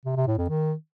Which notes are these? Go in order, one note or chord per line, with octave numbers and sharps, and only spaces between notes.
C3
C3
A2
F2
D#3